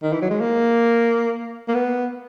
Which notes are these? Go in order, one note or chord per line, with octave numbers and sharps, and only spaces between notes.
D#3
E3
F#3
G#3
A#3
A#3
B3